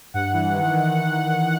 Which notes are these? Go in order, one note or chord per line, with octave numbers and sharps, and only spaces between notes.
G2 F#5
E3
D#3
D#3